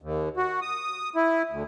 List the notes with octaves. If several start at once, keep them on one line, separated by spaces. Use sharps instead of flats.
D#2
F#4
D#6
E4
D2